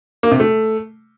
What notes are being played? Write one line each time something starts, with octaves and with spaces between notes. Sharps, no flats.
A#3
C3
A3